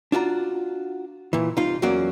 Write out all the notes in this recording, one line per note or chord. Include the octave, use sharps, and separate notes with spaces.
D4 F4 F#4 A#5
A#2 E3
C2 D#4 F4
E2 F#3 A#3 C#4 F#4 D5